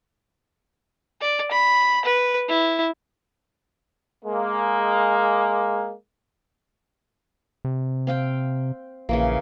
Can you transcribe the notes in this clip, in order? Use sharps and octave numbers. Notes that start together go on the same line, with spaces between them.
D5
B5
B4
E4
G#3 A#3
C3
C4 F5 G5
A#1 C#3 E3 A#3